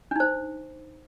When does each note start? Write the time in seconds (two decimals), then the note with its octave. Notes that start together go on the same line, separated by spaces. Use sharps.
0.11 D4
0.16 D#4
0.20 C5